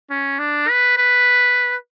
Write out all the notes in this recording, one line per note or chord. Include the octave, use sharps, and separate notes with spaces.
C#4
D4
B4
B4